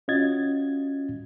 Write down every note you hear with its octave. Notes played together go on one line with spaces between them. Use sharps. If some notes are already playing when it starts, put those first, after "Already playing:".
C#4 F4 F#4 D#5 G#6 A6